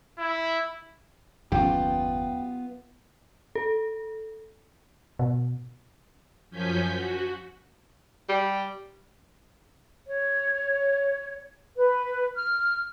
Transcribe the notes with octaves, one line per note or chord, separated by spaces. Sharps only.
E4
F#1 D#2 F#3 G#3 B3 C#4 F4 G4
A4
B2
F#2 F3 C#4 G#5 G6 B6
F#4
G3
C#5
B4
F6